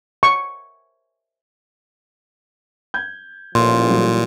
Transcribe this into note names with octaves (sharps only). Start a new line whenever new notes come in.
C#6
G6 G#6
A1 A#2 F3 C6
E3 F#3 G3